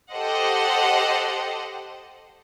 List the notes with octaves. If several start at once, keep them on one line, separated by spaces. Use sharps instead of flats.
G4 A4 C5 D#5 F#5